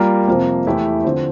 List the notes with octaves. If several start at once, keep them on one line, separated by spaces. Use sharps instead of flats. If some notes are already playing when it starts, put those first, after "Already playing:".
Already playing: G3 A#3 F4 A#4
F2 C3 F3 A#3
E2 E3 A3 E4 G4
D3 F3 C4